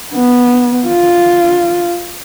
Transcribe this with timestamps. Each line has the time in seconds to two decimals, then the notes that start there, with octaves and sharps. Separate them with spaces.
0.14 B3
0.88 F4